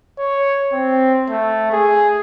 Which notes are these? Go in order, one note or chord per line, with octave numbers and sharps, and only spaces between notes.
C#5
C4
A3
G#4